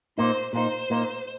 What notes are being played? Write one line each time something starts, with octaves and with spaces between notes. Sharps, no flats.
A#2 A#3 D#4 C5
A#2 A#3 D#4 C5
A#2 A#3 D#4